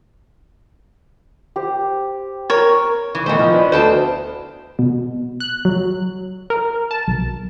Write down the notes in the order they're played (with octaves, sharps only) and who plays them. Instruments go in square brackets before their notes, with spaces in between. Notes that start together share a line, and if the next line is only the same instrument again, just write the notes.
[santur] G4 C5
[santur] A#4 [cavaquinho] C#5
[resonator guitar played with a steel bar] E3 [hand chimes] D#4 C#6
[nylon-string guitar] D#3 E3 A3 [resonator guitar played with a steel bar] B3 C5
[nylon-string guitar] F3 D#4 [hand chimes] D#5 B5 F6
[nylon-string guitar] D4 [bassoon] B4
[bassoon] D2 [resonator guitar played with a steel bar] C5 G5 A5
[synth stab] B2
F#6
F#3
A#4
A5
B1